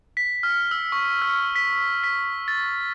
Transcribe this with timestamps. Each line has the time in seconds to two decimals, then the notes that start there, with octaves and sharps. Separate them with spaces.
0.17 B6
0.43 F6
0.71 E6
0.92 C#6
1.22 F6
1.55 B6
2.04 B6
2.48 A6